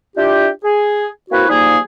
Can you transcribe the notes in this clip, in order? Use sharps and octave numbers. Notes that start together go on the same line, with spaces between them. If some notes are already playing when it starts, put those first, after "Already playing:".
D4 E4 F4 G4
G#4
A#3 C4 E4 F#4 B4 C#5
F3 G3 A#3 D#4 G#4